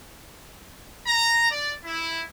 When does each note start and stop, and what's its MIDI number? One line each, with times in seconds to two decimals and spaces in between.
1.06 1.49 82
1.50 1.73 74
1.85 2.22 64